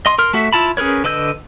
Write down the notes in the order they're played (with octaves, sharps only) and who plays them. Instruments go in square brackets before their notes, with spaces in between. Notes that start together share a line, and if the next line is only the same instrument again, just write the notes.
[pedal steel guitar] D#5 C6
A#4 C6 F6
A3 F#4 E5
E4 F4 A5 B5
C#4 G#4 A#4 B4 C#5
D3 B4 D#5 E6 G6